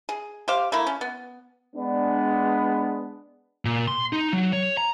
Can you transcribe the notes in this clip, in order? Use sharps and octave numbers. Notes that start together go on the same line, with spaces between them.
G#4
G4 C5 F5
A3 A#3 E4
C#4
B3
G#3 B3 D4
A#2
C6
D#4
F#3
C#5
A#5